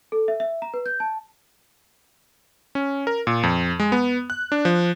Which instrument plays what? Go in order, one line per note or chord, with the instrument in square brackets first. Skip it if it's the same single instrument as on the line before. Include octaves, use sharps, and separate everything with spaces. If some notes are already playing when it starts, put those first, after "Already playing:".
[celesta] A4
E5
E5
A#5
B4
G6
A5
[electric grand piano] C#4
A#4
A#2
F2
G#3
B3
F#6
D4
F3